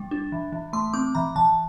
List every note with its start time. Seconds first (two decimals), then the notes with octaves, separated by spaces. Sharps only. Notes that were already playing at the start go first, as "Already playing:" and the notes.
Already playing: G3
0.11 D4
0.32 E3
0.52 E3
0.73 A3 C6
0.93 C4 D6
1.15 E3 A#5
1.35 E3 A5